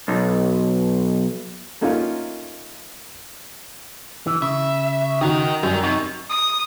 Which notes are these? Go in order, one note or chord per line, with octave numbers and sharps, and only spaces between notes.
B1
A3 A#3 C#4 D#4 F4
E3
C#3 E5
D#3 F#4 A#4 D#5
F#2 G3 A#4 G5
C3 D#4 F#4
D#6